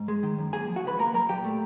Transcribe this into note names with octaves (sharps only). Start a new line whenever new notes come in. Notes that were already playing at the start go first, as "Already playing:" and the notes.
Already playing: G#2
G#3
D#3
F#2
A#3 G#4 G#5
F3
F#4 F#5
C#3 B4 B5
A#3 A#4 A#5
F#3 A#4 A#5
A#2 G4 G5
A3